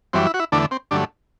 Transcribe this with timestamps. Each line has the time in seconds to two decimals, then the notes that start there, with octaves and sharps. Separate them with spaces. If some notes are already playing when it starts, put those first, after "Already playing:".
0.13 F#2 E3 G3 C4
0.27 E4
0.34 F#4
0.40 E4
0.52 E2 D3 A3 D4
0.71 C4
0.91 G2 D3 F#3 A3 D4